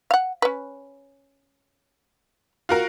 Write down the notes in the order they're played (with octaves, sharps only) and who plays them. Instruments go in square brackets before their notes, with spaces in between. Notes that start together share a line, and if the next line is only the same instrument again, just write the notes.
[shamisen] F5 F#5
C#4 B4
[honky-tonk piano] F4 F#4 A#4